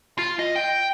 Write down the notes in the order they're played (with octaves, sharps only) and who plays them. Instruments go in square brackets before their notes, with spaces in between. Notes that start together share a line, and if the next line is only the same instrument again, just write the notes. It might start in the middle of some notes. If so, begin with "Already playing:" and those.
[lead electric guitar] F4
D#5
G5